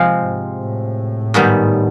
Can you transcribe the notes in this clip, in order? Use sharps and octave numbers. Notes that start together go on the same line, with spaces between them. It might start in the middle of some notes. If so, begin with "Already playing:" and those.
Already playing: C3 F3 G#3 C4
G#2
A2
G#2 D#3 G3 B3